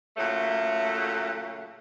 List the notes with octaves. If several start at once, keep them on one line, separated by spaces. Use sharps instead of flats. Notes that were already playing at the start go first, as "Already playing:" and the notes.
A#2 C#3 F#3 A3